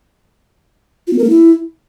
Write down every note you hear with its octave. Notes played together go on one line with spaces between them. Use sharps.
F4
B3
A#4
A#3
E4